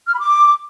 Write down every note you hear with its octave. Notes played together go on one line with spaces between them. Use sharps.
F6
B5
D6